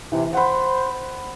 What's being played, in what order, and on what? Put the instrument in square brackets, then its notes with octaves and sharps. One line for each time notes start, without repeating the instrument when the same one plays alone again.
[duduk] C3 [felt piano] E3
[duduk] C5 [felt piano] F#5 B5